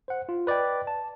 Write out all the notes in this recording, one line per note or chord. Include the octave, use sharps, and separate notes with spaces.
C5 F#5
F4
B4 D5 D#5 G5
A5